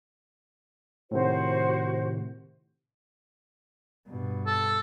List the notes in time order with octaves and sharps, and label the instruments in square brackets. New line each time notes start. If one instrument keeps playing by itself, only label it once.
[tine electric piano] A2 C3 D#3 [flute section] F#4 C5
[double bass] G2 B2
[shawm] A4